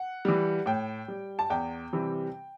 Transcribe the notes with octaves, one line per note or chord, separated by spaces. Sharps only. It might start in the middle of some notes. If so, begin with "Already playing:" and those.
Already playing: F#5
E3 G3
A2 G5
G3
A5
E2 G5
C3 E3 G3